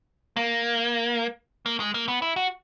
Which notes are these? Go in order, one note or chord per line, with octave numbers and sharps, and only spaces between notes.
A#3
A#3
G#3
A#3
B3
E4
F#4